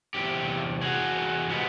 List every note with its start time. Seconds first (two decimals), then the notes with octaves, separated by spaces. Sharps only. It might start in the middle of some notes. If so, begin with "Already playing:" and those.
0.14 E2 C3 G4
0.82 F#4 G#4
1.49 C3 F3 G#3 B3